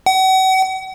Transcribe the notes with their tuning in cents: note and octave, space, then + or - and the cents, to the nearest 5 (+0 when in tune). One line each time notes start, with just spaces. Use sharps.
F#5 +40